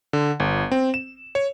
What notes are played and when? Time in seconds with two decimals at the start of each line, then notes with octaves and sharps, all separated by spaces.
0.13 D3
0.40 G1
0.72 C4
0.94 E7
1.35 C#5